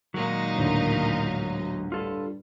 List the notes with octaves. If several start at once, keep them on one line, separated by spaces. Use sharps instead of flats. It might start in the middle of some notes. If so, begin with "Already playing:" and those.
A#2 D#3 F#3 G#3 D#4 D#5
A1 D2
G2 F4 A4 B4